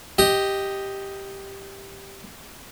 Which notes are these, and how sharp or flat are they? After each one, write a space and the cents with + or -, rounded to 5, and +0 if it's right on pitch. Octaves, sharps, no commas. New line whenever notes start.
G4 +0 D#5 +0